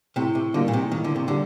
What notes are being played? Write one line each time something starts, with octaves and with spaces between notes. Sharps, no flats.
A2 C3
C3
D3 G3 A#3 D#4
A#2
C3
A2 D#3
D3
C3
D3 G3